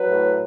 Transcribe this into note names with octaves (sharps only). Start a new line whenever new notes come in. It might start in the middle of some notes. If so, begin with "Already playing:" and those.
Already playing: F#3 B4
A2